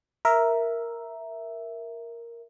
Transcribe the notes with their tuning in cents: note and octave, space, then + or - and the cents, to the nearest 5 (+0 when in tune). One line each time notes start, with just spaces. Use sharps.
A#4 +0 E5 +0